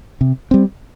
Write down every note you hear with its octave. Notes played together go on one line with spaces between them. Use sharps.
C3
G3 C4